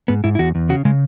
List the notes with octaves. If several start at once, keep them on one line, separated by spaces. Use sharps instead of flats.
G#2 B3
G#2 E4
E4
E2 F#4
E2
C#3 F#4
C#3 G#3